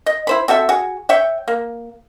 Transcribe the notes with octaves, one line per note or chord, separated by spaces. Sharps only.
D#5
E4 C5 B5
C4 F#4 A4 E5
F#4 G#4
C#5 E5 G5
A#3